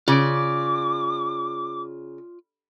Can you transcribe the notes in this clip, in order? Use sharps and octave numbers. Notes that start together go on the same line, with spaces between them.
C#3 F4 D5 D6